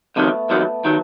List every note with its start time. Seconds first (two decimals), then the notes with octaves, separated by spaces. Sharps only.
0.16 F2 C3 D#3 F#3 A3 B3
0.50 F2 C3 D#3 F#3
0.85 D#3 F#3